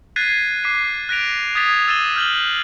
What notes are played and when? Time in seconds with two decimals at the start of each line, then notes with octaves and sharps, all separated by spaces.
0.16 F#6 G#6 A6 B6 C7 D#7
0.64 D6 B6 C7 D#7
1.09 F#6 A#6 B6 D7 F7
1.55 D#6 G#6 A6 B6 F7
1.88 E6 A6 D#7 E7 G7
2.16 F6 G6 F#7 G7